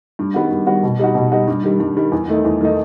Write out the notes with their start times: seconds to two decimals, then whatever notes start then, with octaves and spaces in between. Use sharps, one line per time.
0.19 G2
0.34 D#3 G3 B3 F#4
0.51 G2
0.67 D#3 G3 B3 F#4
0.83 B2
0.99 G3 D#4 F#4
1.15 B2
1.32 G3 D#4 F#4
1.48 G2
1.64 D#3 G3
1.80 G2
1.97 D#3 G3
2.12 E2
2.28 D#3 A3 D#4
2.45 E2
2.61 D#3 A3 D#4